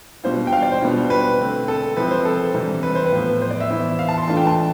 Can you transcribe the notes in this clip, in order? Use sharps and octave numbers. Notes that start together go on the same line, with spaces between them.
B2 G3 D4 F4 C5
G5
F5
D5
C5
B2 G3 B3 D4 F4
B4
D3 A3 C4
A4
C3 F3 C4 E4 B4
C5
A4
C3 E3 G3 D4
B4
C5
B4
A2 F3 B3 F4
C5
D5
E5
E3 B3 E4
F5
A5
C6
E3 A3 D4 F4 A5
G5
A5